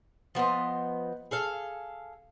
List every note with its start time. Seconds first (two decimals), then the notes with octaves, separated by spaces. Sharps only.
0.35 F3 B3 C5 D#5
1.31 G#4 A4 F5